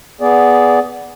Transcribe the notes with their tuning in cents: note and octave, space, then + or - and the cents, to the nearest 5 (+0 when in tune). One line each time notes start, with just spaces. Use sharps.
B3 +0 G#4 +0 D5 -15